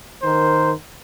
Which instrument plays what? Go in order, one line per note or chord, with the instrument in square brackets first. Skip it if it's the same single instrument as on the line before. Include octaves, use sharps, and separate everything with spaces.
[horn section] D#3 A#4 C5